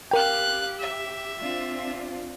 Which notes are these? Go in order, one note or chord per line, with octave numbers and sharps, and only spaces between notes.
G4 A#4 F5 G5 F#6
E5
C4 D4 F4